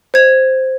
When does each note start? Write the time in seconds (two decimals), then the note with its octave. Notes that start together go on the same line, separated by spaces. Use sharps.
0.14 C5 G#6